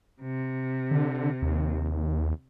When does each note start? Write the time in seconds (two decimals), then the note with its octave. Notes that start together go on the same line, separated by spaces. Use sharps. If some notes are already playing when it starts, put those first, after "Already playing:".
0.22 C3
0.91 D3
1.42 D#2